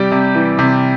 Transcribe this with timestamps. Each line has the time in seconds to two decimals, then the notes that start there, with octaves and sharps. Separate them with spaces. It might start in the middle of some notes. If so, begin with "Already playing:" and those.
Already playing: C3 G3 G4
0.12 C3
0.35 E3
0.59 C3